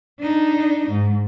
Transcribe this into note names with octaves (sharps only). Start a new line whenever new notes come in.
D4 D#4
G#2